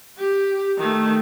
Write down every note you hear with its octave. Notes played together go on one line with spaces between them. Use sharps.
G4
D#3 A3